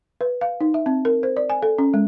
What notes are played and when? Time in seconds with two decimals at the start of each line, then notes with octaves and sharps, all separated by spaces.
0.21 B4
0.41 F5
0.61 D#4
0.74 E5
0.86 C4
1.05 A#4
1.23 C5
1.37 D5
1.50 G#5
1.62 A4
1.78 C#4
1.94 G#3